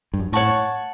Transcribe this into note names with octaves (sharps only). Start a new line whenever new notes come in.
G2
F#2
A2 C#5 F#5 A5 C#6